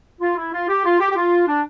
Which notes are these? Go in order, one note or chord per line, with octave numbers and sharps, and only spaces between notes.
F4
E4
F4
G4
F4
G4
G4
F4
D4